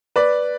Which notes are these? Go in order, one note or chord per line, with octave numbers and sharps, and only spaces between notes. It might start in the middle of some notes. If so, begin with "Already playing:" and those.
B4 D5